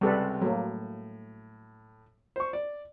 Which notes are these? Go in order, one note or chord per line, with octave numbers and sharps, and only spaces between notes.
C#2 C3 G3 A4 B4
A2 F#3 A#3
C5 C#6
D5